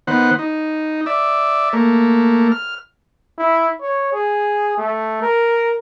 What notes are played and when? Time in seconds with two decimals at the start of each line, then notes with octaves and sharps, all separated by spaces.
0.07 D#3 B3 C5 F#5
0.39 D#4
1.06 D5 E5
1.73 A3 A#3
2.52 F6
3.38 E4
3.81 C#5
4.13 G#4
4.78 A3
5.22 A#4